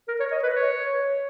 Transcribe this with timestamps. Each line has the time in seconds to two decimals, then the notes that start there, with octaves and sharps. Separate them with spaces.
0.08 A#4
0.20 C#5
0.32 D#5
0.43 B4
0.55 C#5